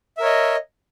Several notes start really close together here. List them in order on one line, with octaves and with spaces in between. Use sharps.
E5 A#4 C#5 D#5